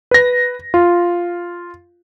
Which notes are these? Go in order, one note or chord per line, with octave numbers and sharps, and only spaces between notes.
B4 A#6
F4